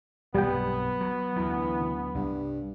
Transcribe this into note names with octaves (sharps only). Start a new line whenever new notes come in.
B1 G2 C3 G3 B3 G5
F#3
D2 E3 F#3
C2 G2